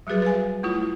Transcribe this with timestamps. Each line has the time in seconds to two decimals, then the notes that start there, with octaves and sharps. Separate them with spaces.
0.07 F#3 G3 F#4 G#4 B4
0.22 B4 F5 G#5
0.63 A3 E4 F4